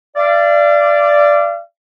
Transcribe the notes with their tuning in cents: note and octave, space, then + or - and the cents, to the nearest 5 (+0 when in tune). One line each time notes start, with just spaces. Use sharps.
D5 +0 F5 -40